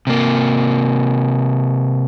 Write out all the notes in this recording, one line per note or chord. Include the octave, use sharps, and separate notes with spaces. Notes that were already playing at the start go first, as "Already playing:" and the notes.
C3 A#3